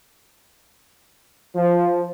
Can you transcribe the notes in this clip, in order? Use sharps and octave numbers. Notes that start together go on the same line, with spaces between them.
F3